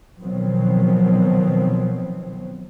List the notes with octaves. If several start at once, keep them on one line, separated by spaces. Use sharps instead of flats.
B2 D#3 F3 F#3 B3 C4